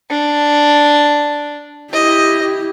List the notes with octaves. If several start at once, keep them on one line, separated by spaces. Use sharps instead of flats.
D4
E4 G4 D#5